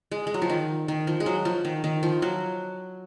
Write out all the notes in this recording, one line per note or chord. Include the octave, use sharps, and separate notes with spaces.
G#3
G#3
F#3
F3
D#3
D#3
F3
G#3
F#3
F3
D#3
D#3
F3
F#3